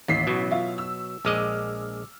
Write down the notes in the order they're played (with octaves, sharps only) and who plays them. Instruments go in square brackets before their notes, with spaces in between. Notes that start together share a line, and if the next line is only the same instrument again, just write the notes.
[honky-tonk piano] A1 B6 C7 [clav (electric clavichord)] D#2
[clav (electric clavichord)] B2 F#3
[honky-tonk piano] F4 E5
E6
[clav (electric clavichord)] A#1 G#3 D#5 [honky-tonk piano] D6 E6 F6